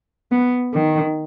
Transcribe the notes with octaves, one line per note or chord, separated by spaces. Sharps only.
B3
D#3